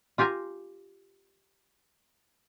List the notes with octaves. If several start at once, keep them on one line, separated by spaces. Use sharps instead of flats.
F4 G4 F5 G#5 A#5